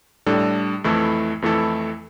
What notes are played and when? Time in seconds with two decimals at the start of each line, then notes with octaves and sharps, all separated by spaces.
0.26 A2 G3 D4 A4
0.84 F2 E3 A3 E4 A4
1.42 F2 E3 A3 E4 A4